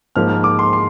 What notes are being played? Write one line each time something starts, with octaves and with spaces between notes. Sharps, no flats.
G#2 F3 A#3 F6
F6
D6
C6
C6